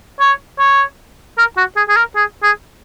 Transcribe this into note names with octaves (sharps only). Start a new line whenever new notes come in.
C#5
C#5
A#4
F#4
G#4
G#4
A#4
G#4
G#4